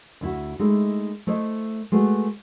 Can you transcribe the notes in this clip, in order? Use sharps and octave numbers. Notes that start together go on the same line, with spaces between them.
D2 E4 F#4
G#3 A3 D#4 E4
A3 E4 C5 D#5
G#3 A3 F#4 B4